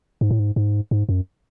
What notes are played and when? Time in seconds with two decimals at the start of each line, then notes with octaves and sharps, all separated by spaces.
0.21 G#2
0.31 A2
0.39 G#2
0.56 G#2
0.91 G#2
1.09 F#2